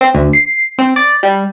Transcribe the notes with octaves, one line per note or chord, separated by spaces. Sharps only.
C4
D2
C7
C4
D5
G3